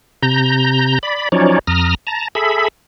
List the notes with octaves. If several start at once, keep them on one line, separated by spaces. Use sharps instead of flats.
C3 A#5 G6
D5 B5
F3 F#3 C#4 D#4 C#5 D5
F2 A#5 D#6 F6
A5 A#5
G#4 A4 E5 B5